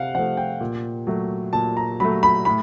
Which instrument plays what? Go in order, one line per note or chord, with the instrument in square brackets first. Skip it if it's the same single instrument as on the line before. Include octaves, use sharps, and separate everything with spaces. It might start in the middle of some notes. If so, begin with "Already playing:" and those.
Already playing: [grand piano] C3 F5 F#5
F3 F#5
A3
G5
A#2
F#3 A3
A#2 A5
A#5
F#3 B5
A3
B5
A2 B5